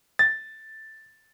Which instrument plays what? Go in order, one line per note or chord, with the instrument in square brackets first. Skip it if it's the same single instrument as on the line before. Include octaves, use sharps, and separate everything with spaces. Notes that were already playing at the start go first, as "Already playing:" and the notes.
[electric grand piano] A6